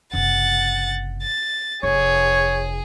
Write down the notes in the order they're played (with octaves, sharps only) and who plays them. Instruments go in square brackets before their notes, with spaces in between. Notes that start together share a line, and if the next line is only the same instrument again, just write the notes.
[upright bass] F#1 C3 [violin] F#5 A6
[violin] A6
[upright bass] F1 [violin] G#4 [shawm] C#5